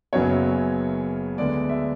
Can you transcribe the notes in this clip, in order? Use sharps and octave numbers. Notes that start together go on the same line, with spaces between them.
F#1 F#2 C#3 F#3 B3 C#5
D2 D3 G#3 B3 D5
E5